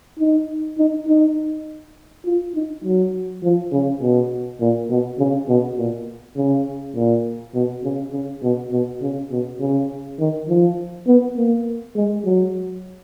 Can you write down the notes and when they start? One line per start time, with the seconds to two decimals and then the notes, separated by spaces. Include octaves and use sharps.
0.19 D#4
0.78 D#4
1.07 D#4
2.25 F4
2.55 D#4
2.84 F#3
3.43 F3
3.72 C#3
4.01 B2
4.60 A#2
4.89 B2
5.19 C#3
5.49 B2
5.78 A#2
6.36 C#3
6.96 A#2
7.54 B2
7.84 C#3
8.13 C#3
8.43 B2
8.72 B2
9.02 C#3
9.31 B2
9.60 C#3
10.19 D#3
10.48 F3
11.07 B3
11.36 A#3
11.96 G#3
12.25 F#3